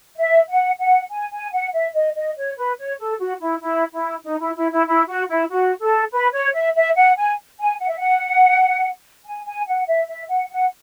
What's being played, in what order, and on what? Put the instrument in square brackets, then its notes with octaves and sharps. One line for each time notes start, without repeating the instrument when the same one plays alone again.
[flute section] E5
F#5
F#5
G#5
G#5
F#5
E5
D#5
D#5
C#5
B4
C#5
A4
F#4
E4
E4
E4
D#4
E4
E4
E4
E4
F#4
E4
F#4
A4
B4
C#5
E5
E5
F#5
G#5
G#5
F#5
E5
F#5
G#5
G#5
F#5
E5
E5
F#5
F#5